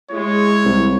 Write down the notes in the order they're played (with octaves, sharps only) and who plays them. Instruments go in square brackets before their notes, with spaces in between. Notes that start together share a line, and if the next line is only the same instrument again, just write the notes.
[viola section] G#3 [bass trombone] E4 [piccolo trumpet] C#5
[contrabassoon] C2